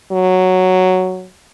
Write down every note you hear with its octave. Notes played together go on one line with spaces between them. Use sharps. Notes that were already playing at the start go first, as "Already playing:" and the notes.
F#3